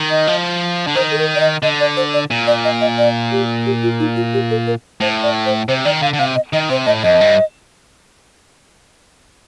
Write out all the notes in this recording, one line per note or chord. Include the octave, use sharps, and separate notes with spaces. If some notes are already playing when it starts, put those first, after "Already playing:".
Already playing: D#3
D#5
F3
D3
D#3 C5
A4
A#4
D5
D#5
D3 D#5
D5
C5
D5
A#2
D5
D#5
D#5
D5
G4
G4
F4
D#4
F4
G4
A4
A#4
A2 C5
D5
C5
C3 C5
D#3 D5
D3 F5
D3
C3 F5
D#5
D#3 D#5
C3 C5
A2 D#5
F2 D#5
G2